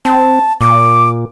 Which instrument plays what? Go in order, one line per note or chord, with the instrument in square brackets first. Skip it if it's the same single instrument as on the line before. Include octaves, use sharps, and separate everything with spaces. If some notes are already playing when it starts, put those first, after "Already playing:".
[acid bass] C4 [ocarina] A5
[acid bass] A#2 [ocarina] D6